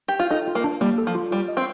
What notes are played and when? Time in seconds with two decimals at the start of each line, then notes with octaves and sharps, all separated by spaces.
0.08 G4
0.19 F4
0.30 D#4 A4
0.48 F4
0.55 A#3
0.64 D4
0.81 G3 A#3
0.98 A4
1.07 F3
1.15 F4
1.31 G3 F4
1.48 D#5
1.57 C4